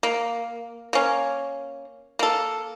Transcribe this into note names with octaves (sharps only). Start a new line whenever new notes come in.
A#3
A#3 C#4
A#3 A4